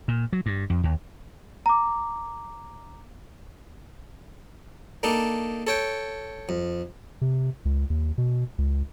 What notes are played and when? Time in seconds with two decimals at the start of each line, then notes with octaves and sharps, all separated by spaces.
0.08 A#2
0.33 F#3
0.46 G2
0.70 F2
0.83 D#2
1.66 A#5 D6
5.03 A#3 D4 D#4 A4
5.67 A4 C#5 G5
6.49 F2
7.21 C3
7.65 C#2
7.90 D#2
8.18 B2
8.58 C#2